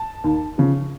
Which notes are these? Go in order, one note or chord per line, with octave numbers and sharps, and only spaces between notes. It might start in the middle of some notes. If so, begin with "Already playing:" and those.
Already playing: A5
D#2
C#3 F3